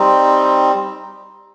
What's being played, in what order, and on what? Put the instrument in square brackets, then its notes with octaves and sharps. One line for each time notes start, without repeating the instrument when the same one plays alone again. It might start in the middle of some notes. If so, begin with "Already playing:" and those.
Already playing: [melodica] G3 C4 D#4